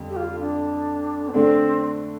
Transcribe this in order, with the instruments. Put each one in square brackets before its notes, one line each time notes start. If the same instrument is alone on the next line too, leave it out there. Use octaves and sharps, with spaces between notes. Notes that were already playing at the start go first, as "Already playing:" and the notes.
Already playing: [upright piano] F2 D3 G3
[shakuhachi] G4
F4
D4
B3
[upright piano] D3 A3 D4 [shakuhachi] C4